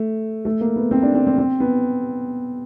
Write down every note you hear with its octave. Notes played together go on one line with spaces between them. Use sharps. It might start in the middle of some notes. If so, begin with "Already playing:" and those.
Already playing: A3
A3
A#3
B3
C4
D4
C4
C4
C4
B3